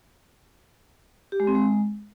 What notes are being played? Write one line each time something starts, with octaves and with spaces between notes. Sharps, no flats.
G4
G#3
C4
G#3